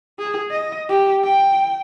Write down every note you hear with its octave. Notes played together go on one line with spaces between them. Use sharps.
G#4
D#5
G4
G5